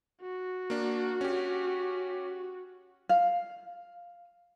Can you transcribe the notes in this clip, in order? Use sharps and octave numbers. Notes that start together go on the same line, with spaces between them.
F#4
A#3 D4
C#4 G4
F5